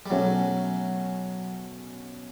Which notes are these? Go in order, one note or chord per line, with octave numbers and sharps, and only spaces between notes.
G3
B2 F#3 A3 C#4